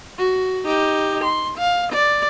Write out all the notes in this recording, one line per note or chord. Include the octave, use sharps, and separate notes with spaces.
F#4
D#4 G4
C6
F5
D5